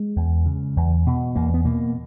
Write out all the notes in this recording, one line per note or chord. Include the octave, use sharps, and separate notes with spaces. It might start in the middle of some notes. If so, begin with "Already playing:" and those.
Already playing: G#3
E2
C#3
E2
B2
E2 A#3
B3
B2 A#3